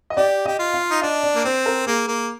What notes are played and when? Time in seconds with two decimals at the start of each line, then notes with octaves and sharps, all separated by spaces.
0.10 D#5
0.17 G4 D5
0.46 G4 D#5
0.59 F4
0.74 F5
0.91 D#4
1.02 D4 D#5
1.23 D5
1.35 A#3
1.44 C4 C5
1.66 A#4
1.86 A#3 G#4
2.08 A#3